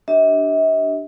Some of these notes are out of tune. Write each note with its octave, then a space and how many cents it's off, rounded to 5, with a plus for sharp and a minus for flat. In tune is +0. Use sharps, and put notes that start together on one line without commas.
D4 +0 G4 -10 E5 -45